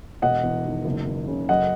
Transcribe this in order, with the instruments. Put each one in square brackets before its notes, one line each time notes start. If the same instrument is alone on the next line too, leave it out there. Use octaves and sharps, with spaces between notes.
[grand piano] E1 D#5 F#5
E2
D#3
F#1
E2
C#3
F#2 D#5 F#5